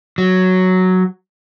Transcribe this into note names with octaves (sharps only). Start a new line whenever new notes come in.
F#3